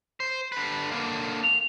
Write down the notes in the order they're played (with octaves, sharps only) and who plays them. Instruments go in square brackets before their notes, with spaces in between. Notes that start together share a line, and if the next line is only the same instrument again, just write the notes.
[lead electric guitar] C5
D3 B4
D3 A#3
[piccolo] F7